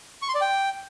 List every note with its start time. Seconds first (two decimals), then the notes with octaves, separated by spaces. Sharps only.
0.22 C#6
0.29 C6
0.35 D5
0.41 G5